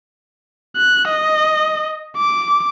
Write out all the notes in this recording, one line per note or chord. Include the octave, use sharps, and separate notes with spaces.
F#6
D#5
D6